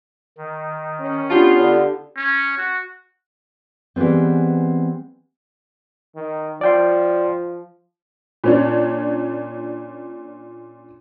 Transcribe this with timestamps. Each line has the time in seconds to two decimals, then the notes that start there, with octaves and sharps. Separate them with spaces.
0.37 D#3
1.00 C#4
1.30 B3 D4 F4 G4 A5
1.60 D3
2.16 C#4
2.58 F#4
3.96 E3 G3 G#3 B3 C4
6.16 D#3
6.61 F3 D5 G5 C6
8.44 A#2 C#4 D4